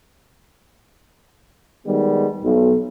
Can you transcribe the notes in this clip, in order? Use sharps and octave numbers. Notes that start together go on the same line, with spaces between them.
D#3 G3 G#3 B3
B1